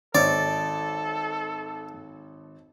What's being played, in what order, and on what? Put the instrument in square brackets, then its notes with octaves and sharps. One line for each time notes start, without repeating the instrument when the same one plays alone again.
[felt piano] G#1 C#5 [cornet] A4 [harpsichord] D5